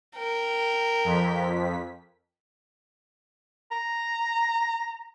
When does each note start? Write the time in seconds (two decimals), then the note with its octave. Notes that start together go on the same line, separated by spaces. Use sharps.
0.16 A#4 G5
1.04 F2 B6
3.71 A#5